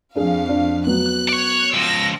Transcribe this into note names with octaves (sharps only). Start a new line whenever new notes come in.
F2 D4 G#4 F5
D4
F#3 B3 F#6
C#5 D5
C#2 F3 E6 A#6